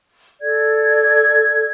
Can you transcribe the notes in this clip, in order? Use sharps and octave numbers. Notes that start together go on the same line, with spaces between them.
A4 D5 G#6